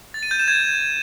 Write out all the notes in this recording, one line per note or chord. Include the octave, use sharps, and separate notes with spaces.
A6
D#7
G6
E7
G#6